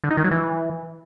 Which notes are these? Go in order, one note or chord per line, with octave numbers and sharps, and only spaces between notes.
D3
D#4
D#3
F#3
E3